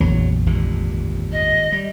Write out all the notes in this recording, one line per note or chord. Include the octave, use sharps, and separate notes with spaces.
F1 A#1 E2 F#3
G#1 G2 A#2
D#5
G3